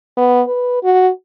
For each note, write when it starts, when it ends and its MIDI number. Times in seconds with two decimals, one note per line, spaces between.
0.17 0.42 59
0.47 0.82 71
0.83 1.09 66